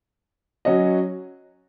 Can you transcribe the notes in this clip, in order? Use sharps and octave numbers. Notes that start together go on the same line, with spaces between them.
F#3 C#4 F#4 D#5